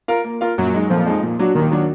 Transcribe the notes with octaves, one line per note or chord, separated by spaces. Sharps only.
F4 A#4 F5
A#3
F4 A#4 F5
F#2 A#2 F#3
G#3 D#4
F2 A#2 F3
G#3 D#4
A#2
F#3 D4 F#4
D#2 A#2 D#3
F#3 D4 F#4